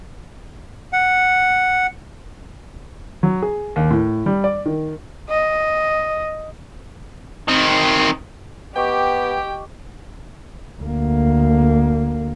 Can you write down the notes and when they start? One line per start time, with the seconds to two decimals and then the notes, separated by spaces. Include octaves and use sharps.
0.93 F#5
3.23 F#3
3.42 G#4
3.76 D#2
3.91 A2
4.26 G3
4.44 D5
4.66 D#3
5.30 D#5
7.48 D#3 C4
8.76 B3 G4 D#5 G5 C#6 D6
10.83 D2 A#3